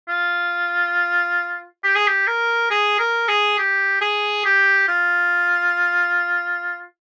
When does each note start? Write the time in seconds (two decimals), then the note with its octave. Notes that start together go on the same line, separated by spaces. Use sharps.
0.09 F4
1.84 G4
1.96 G#4
2.08 G4
2.27 A#4
2.71 G#4
2.99 A#4
3.28 G#4
3.58 G4
4.01 G#4
4.45 G4
4.88 F4